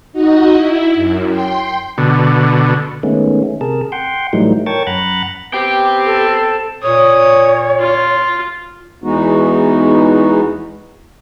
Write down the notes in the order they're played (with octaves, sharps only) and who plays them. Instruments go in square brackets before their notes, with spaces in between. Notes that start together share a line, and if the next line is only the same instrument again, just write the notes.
[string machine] D#4 F#4 D#5
E4
F#2
G5 C6
[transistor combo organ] B2 D3
[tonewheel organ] D#3 G#3 A3 B3 C#4
C3 G#4 A#4 A5
F#5 G5 C6
A2 E3 F#3 G3 A3 D#4
A#4 C#5 G5 A5 C#6 A6
F#2 F#5 A#5 B5 F#6 A6
[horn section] B3 C4 [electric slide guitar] G4 G5
[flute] A4
[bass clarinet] A#2 [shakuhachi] C#5 [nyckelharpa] D#6
[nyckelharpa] F4
[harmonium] E2 E3 G#3 B3 D#4 F#4